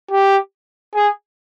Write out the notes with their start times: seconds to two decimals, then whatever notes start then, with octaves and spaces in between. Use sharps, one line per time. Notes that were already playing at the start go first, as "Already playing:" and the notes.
0.11 G4
0.95 G#4